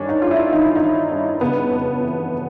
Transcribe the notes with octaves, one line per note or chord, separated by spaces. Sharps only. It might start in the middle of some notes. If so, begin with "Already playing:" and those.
Already playing: G2 D#3 C#4 D4
D#4
G2 F4
E4
D#3 D#4
E4
D#4
D#3
G2
C#3 B3
F2
E3